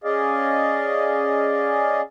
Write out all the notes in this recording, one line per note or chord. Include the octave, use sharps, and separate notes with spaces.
C#4 G#4 D5 D#5 F5